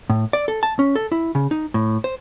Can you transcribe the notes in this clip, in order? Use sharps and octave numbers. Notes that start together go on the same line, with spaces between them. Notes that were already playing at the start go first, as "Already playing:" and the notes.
A2
D5
A4
A5
C#4
A4
E4
C#3
D#4
A2
C5